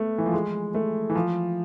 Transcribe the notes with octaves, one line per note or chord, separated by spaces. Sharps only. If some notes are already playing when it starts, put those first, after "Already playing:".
Already playing: A3 B3
E3
F3
G#3
A3
E3
F3